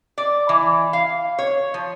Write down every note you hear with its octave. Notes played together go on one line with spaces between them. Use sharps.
D5
E3
F5
C#5
F3